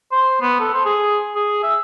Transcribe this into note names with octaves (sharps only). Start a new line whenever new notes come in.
C5
B3
A4
C5
G#4
G#4
E5